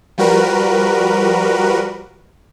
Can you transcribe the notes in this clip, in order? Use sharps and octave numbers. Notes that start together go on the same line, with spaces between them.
F3 G3 F#4 A#4 B4